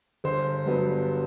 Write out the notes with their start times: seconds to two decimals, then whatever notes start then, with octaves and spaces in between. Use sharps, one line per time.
0.24 G1 C5
0.66 G2 F#3 B3